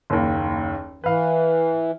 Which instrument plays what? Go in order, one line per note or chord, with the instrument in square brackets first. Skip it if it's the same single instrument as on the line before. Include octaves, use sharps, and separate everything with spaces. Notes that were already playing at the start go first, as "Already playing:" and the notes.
[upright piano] F#1 D#2
[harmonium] E3 [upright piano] B4 F5